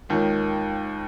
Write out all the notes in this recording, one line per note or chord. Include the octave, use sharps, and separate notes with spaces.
D#2 D#3 G#3 F4 A#4 C#5